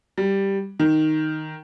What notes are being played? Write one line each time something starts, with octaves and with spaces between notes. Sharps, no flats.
G3
D#3